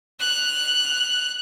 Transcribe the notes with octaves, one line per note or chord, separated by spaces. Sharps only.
F6 F#6